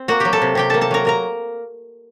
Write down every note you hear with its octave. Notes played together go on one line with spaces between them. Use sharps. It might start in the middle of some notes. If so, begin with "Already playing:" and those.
Already playing: C4
A#3 F#4 F#5
F#3 G4 G5
A4 A5
C3
C3 G4 G5
A#3 A4 A5
A4 A5
F#3 A#4 A#5
A#3 A#4 A#5